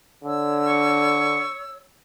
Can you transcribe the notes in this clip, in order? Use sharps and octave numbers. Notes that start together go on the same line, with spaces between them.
D3 C#5 E6
C#6